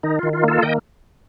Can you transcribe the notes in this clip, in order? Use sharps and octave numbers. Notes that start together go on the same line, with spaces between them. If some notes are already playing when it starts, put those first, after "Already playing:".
D#3 D#4
D#3 F4
F4
A#3 F4 A4
D#3 D#5 G5